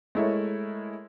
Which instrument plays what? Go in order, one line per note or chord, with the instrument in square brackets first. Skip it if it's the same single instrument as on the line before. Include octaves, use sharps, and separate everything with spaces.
[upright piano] G#3 A3 E4 A#4 C#5